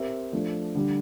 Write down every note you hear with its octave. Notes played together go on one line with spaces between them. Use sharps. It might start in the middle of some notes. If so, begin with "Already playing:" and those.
Already playing: C4 G4 A#4 E5
F3 A3 D4
D3 G3 D4